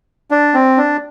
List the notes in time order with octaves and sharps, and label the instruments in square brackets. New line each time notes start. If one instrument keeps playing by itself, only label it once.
[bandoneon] D4
C4
D4